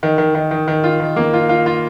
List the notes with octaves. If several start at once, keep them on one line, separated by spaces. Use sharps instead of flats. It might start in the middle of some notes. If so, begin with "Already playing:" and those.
D#3
D#3
D#3
D#3
D#3
F4
D#3
A#3
F4
F4
F4